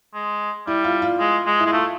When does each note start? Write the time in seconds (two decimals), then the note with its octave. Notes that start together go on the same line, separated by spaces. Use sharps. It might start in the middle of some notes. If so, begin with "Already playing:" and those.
0.14 G#3
0.67 G3 E4
0.84 F4
1.02 F4
1.20 G#3
1.46 G#3
1.60 E4
1.66 G#3
1.72 A3 F4